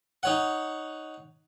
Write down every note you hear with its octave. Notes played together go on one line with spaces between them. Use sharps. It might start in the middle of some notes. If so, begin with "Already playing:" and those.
D#4 C#5 F#5